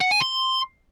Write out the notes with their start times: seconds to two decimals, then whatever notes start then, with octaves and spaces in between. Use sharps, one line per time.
0.01 F#5
0.11 G#5
0.21 C6